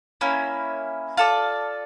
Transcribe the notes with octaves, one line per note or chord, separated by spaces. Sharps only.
A#3 C#4 E4
F4 A4 D5